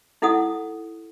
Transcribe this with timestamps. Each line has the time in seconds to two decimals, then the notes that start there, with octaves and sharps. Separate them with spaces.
0.22 D#4 E4 A4 F#5 D#6